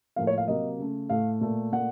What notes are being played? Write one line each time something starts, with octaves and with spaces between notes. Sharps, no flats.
A2 F3 A#3 F5
C#5
F5
C3 F#3 A#3 D#5
C#3 A3
A2 A3 F5
A#2 A3
A#2 A3 F#5